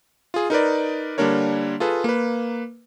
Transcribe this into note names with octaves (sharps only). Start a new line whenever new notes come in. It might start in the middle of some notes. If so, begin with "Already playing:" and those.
F4 G#4
D#4 A#4 B4 D5
D3 G3 A#3 D4 A#4 C#5
F4 G#4 A4 B4
A#3 B4